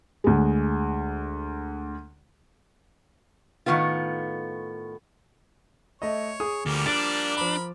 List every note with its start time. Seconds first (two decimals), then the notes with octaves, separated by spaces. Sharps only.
0.24 D2 G#3
3.66 A2 D#3 G#3 B3 F4
6.02 A3 C#5 D#5
6.40 G#4 D#6
6.66 D2 F3 G3 A#3
6.86 D4 F#6 A6
7.37 F3 A#4 B5 D6